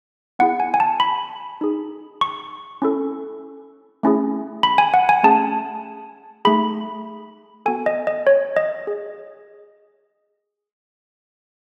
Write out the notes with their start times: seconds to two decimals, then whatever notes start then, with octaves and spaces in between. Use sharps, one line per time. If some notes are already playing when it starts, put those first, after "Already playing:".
0.39 B3 E4 G#4 F#5
0.60 G#5
0.74 G#5
0.80 A5
1.00 B5
1.61 D#4 G#4
2.21 C#6
2.82 C#4 E4 A4
4.03 A3 C#4 E4 G#4
4.63 B5
4.78 G#5
4.94 F#5
5.09 G#5
5.23 A3 C#4 G#4 A5
6.45 A3 D#4 G#4 B5
7.66 B3 F#4 A4 G#5
7.86 D#5
8.07 D#5
8.27 C#5
8.57 D#5
8.87 G#4